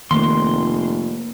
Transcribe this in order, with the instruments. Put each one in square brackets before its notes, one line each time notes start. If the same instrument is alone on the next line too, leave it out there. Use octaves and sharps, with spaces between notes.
[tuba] F1 [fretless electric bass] D#3 A3 [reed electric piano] A#3 [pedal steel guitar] C6